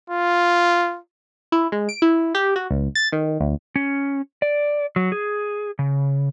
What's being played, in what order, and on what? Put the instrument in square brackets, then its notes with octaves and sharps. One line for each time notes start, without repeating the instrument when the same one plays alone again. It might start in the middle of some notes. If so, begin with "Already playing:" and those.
[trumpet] F4
[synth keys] E4
G#3
D7
E4
G4
F#4
C#2
A6
D#3
D2
[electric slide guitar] C#4
D5
F#3
G#4
C#3